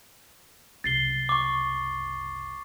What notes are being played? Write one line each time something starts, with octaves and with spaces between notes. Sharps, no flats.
F#1 C2 A6 C7 G7
C#6 D6